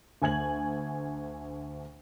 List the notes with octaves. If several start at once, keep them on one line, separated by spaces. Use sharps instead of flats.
D2 G#5 G#6 F#7